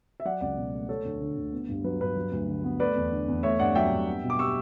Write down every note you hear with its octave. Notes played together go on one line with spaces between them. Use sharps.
E5
F#3 D5 F#5
C#2 D5 F#5
B2
A3
A3 A4 C#5
D2
D3
D2
B3
G2
F#3 B4
G2 B4
F#3
D2
D3
B3
A3 B4 D5
E2
D3
E2
A3 C#5 E5
G2 D5 F#5
F#3 E5 G5
G2
B3
B2
D6
G3 C#6 E6